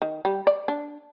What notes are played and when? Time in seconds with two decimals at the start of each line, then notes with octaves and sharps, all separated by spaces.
0.02 D#3
0.25 G3
0.47 D5
0.68 D4